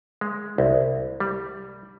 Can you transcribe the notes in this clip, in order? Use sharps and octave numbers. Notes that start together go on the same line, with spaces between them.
G#3
C2
G3